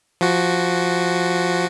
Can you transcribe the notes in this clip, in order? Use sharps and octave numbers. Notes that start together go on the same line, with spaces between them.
F3 F#4